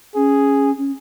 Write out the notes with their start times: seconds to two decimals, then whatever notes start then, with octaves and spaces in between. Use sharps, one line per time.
0.15 C#4 G#4
0.77 C#4